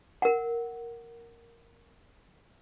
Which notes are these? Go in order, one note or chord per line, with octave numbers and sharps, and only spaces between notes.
A#4 F#5